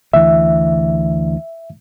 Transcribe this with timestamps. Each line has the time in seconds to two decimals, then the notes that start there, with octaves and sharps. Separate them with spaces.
0.14 D2 E3 E5